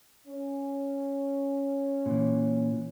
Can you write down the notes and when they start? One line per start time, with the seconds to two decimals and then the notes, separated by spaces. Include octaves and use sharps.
0.27 C#4
2.06 A#2 E3